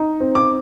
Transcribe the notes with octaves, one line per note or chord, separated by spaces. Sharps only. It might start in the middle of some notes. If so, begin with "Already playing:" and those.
Already playing: D#4
C4
D6